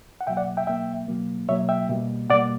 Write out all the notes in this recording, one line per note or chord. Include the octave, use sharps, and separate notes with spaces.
F#5
B2 F#3 A#3 E5 G5
D5 F#5
E5 G5
B2 F#3 A#3 E5 G5
B2 F#3 A#3
B2 F#3 A#3 C#5 E5
E5 G5
B2 G3 A#3
B2 G3 A#3 D5 F#5